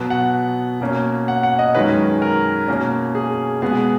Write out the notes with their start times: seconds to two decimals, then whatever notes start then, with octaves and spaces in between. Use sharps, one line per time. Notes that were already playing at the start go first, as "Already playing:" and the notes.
Already playing: B2 F#3 B3
0.10 F#5
0.81 B2 A#3 C#4
1.28 F#5
1.43 F#5
1.59 D#5
1.74 F#2 D#3 G#3 C#4 B4
2.22 A#4
2.68 B2 A#3 C#4
3.15 G#4
3.62 B2 G#3 B3 G#4